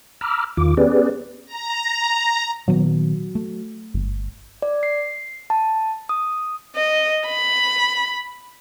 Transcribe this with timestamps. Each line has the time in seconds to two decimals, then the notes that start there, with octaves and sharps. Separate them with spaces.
0.21 A#5 B5 D6 E6 F6
0.57 E2 D#3 F4 D6
0.77 B3 C#4 G4 G#4 B4 D5
1.46 A#5
2.68 A#2 D#3 F#3 B3
3.35 A3
3.94 G1
4.62 D5
4.83 C7
5.50 A5
6.09 D#6
6.76 D#5
7.27 B5